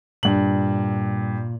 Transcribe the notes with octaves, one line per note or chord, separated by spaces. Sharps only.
G2 A#2 F#7